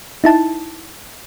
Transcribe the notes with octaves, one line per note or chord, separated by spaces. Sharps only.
D#4 E4 A5